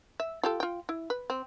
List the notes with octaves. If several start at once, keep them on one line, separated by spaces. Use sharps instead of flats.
E5
F4 G4 A4
F4 G5
E4
B4
C4